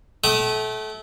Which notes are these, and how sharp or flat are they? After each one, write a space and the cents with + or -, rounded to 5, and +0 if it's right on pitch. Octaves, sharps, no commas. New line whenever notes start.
A3 -25 G5 -35 D#6 +0